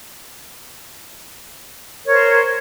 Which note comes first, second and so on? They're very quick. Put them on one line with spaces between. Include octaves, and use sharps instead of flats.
A#4 C#5 C5